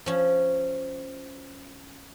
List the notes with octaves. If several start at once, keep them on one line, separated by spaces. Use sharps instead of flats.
F3 C#4